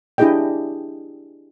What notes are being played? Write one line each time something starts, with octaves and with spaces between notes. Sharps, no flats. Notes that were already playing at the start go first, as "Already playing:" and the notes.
D4 E4 G4 G#4 D#5 G5